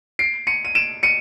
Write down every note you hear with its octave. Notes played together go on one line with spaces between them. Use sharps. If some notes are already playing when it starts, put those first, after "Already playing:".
C7 D7
C#7 D#7
D#7
D7 E7
C#7 D#7